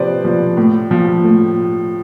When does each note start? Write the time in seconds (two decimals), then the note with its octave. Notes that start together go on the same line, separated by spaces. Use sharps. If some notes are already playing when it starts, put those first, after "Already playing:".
Already playing: C3 F3 B4 C5 D5
0.25 F3
0.57 A2
0.91 F3
1.24 A2